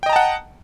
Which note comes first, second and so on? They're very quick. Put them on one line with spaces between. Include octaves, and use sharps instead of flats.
G5 D#5 A#5 A5 F#5